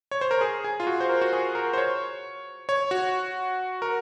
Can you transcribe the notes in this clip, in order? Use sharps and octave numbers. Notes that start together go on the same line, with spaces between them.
C#5
C5
A#4
G#4
G#4
F4
F#4
C5
A#4
F#4
G#4
A#4
C5
C#5
C#5
F#4
A#4